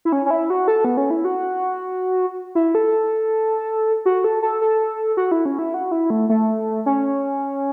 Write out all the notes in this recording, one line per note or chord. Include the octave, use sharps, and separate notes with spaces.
E4
C#4
C#4
E4
F#4
A4
B3
C#4
E4
F#4
E4
A4
F#4
A4
A4
A4
F#4
E4
C#4
E4
F#4
E4
A3
A3
C#4